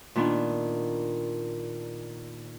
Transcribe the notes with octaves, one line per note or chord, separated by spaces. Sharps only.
A#2 D#3 B3 D4